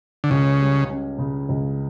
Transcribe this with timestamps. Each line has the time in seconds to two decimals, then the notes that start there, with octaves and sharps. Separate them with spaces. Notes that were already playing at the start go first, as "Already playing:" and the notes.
0.24 D3
0.31 C#2 C#3
0.60 G3
0.90 C#4
1.18 C#3
1.49 C#2